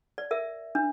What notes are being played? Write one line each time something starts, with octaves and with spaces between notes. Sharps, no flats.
D5
A#4 E5
D4